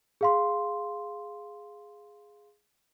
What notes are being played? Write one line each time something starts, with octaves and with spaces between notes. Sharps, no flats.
G#4 F5 C6